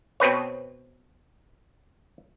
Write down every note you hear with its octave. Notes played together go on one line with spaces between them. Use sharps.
B2 C4 B4 C#5